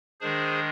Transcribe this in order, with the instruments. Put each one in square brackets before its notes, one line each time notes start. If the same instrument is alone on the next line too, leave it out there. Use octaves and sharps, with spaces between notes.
[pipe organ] D#3 G#3 D4 G#4 C5